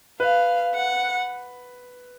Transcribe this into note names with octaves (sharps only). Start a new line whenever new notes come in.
B4 F5
F#5